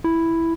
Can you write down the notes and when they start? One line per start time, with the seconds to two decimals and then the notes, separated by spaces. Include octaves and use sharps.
0.04 E4